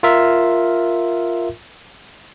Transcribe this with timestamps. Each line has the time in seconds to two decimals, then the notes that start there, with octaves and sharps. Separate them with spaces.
0.03 F4 A#4 E5